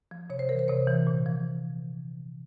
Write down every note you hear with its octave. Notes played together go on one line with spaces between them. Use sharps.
F3
C3 C#5
C5
E3 A#4
C5
C3 C#5
E3
A#2
F3